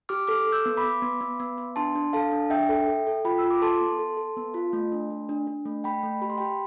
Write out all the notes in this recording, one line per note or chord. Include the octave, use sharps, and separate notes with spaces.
G4 D6 F6
A4 D6 F6
A4
E6 G6
B3
B5 D6
B3
B3
B3
B3
B3
D4 A5 C6
D4
A4 F5 A5
D4
D4 E5 G5
A4
A4
A4
F4 G5 B5
F4 E6
D6
A4 A5 C6
B3
A4
A4
B3
F4
A3
D4
A3
D4
D4
A3
A3 G5 B5
A3
G4 B5
C6
G4 G5 B5